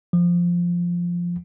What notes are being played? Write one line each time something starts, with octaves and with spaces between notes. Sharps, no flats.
F3